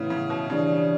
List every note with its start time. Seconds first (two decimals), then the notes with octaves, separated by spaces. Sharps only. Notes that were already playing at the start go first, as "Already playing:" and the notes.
Already playing: A2 C#3 E3 B3 E4
0.10 C#3
0.30 B2
0.49 C#3 E3 G3 D4